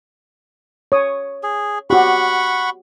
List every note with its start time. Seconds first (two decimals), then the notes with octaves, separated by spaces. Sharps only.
0.92 C#5 D#6
1.43 G#4
1.90 F#4 G4 F#5 B5 C#6